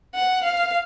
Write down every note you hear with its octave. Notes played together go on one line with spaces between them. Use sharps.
F#5
F5